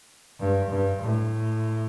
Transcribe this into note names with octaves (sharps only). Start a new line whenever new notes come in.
G2
G2
A2